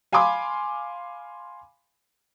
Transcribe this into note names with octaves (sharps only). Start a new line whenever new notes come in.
F5 G#5 B5 C6 D6